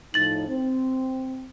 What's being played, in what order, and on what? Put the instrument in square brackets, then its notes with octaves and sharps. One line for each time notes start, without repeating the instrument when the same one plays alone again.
[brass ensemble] A2 F3 D#4 [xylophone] A6 F#7
[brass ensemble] C4